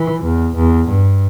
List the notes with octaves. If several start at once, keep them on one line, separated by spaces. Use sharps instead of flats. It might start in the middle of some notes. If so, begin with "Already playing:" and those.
Already playing: E3
E2
E2
G2